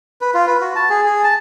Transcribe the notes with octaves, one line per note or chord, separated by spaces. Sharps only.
B4
F4
B4
F#4
A5
G#4
G#4
A5